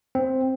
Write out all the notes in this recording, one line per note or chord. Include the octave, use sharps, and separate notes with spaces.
C4